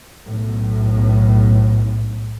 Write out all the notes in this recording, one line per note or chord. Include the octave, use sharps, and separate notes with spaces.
B1 A2